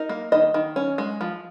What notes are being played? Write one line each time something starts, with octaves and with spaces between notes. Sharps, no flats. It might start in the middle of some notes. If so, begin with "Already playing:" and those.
Already playing: D#4 A#4
A#3
D#3 D#5
D#3
C#4
G#3
F3